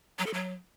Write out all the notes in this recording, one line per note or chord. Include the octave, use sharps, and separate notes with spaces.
F#3
A4
F#3